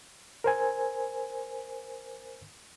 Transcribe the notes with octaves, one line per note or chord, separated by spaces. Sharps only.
A#4 C5 G#5